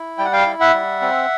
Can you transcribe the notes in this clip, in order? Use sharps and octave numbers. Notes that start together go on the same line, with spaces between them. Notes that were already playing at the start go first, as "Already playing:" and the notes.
Already playing: E4
G3 G5
F#5
F5 G5
E4
E5 F#5
G3
C4